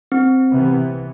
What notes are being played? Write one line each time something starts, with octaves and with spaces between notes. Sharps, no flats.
C4
C3 E3 B3